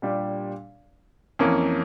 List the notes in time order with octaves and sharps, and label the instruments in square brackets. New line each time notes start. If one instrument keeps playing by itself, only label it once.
[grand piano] A#2 G3 D4 G4
F2 E3 A#3 C#4